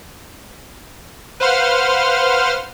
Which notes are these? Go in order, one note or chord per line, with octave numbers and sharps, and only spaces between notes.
B4 C5 F5 F#5 C6 F6